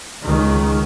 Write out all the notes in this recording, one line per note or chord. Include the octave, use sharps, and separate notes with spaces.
C#2 D#3